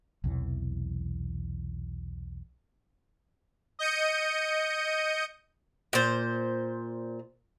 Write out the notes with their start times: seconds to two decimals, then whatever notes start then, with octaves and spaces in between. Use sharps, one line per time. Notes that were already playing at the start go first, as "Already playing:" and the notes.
0.24 B1 E2 C3 E3
3.79 D#5 G6 C#7 D#7
5.93 A#2 C5